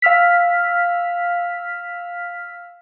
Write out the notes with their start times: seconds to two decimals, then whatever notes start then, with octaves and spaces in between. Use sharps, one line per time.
0.02 F5 E6 F6 B6